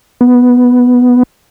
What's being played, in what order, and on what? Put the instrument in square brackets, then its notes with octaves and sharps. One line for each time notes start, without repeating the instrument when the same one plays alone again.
[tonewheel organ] B3